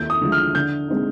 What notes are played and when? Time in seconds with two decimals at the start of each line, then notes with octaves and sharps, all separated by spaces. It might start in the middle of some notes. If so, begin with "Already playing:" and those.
Already playing: D#2 G6
0.10 D#6
0.21 D3 F3 G#3
0.32 F6
0.55 D3 G6
0.88 G#3 C4 D#4